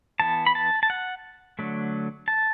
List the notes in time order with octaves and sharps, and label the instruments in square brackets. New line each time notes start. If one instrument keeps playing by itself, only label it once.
[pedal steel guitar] E3 B3 A5
B5
A5
A5
F#5
D3 F#3 A3
A5